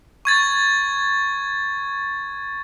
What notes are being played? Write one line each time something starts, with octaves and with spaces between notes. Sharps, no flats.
C#6 G#6 A6